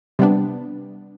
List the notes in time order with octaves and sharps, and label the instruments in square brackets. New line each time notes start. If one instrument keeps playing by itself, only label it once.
[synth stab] C3 G3 B3 D4